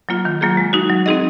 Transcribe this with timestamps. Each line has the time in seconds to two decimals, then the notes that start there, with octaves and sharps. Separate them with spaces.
0.09 F#3 A#3 F4
0.25 D#3
0.41 F#3 A#3 F4 G#4
0.57 G#3
0.73 D#4 F#4
0.89 F#3
1.06 C4 D#4 G#4 D#5